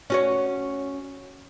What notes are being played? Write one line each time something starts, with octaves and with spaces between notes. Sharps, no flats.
C#4 F#4 C#5